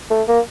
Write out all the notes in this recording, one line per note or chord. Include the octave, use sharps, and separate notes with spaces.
A3
A#3